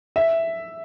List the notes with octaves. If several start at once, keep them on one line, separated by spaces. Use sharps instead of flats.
E5